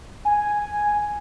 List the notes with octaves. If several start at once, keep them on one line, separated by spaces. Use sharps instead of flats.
G#5